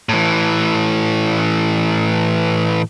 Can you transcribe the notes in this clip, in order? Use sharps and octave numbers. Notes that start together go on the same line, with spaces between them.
A2 E3